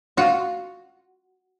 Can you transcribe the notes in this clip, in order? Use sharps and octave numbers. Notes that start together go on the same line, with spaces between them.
F4 F#4